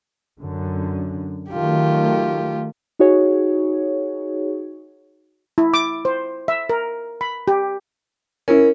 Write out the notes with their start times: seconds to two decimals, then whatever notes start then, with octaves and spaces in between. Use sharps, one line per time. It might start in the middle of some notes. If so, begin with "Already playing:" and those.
0.40 F#2 D3
1.51 D#3 F#3 A3 F4 G4
2.99 D#4 F#4 G#4 C#5
5.58 E4
5.74 D6
6.05 C5
6.48 E5
6.70 A#4
7.21 B5
7.48 G4
8.48 C#4 E4 A#4